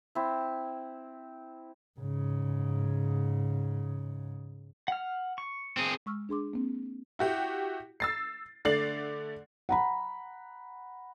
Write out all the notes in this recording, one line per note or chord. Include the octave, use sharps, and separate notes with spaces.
C4 E4
G#2 C#3
F#5 F6
C#6
C4 G#4
G#3 C#6 E6 F6
D4 G#4 C6 D6
A#3 C4
E4 F#4 G4
E6 A6 C7
D3 A3 D5 A6 C7 F#7
F#5 A#5 B5